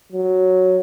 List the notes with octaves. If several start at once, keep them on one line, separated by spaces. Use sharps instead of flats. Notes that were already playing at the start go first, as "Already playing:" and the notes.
F#3